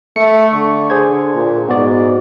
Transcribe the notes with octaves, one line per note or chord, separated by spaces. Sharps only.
A3 C#7
D3 C#6
G#4 C5 G#6
A#2
G#2 B3 F#4 D5